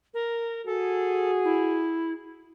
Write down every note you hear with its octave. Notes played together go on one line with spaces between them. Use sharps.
A#4
F#4 G#4 A4
E4